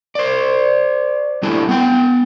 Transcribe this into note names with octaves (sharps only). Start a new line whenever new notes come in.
C5 D5
G3 A3 D4 E4
B3 G5